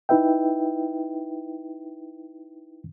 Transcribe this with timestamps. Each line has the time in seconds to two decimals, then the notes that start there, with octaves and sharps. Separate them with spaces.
0.09 D#4 E4 B4 E5 G5